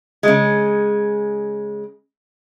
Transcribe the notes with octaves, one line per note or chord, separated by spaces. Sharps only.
C#3 G#3